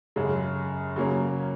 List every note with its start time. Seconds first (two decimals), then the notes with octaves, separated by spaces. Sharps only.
0.16 F#2 C#3 G#3
0.96 C#3 F#3 A#3 C#4